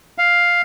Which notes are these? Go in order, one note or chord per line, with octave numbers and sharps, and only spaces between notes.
F5